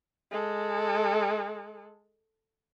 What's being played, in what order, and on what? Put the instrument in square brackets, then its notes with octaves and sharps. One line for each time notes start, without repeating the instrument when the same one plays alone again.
[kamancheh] G#3 A4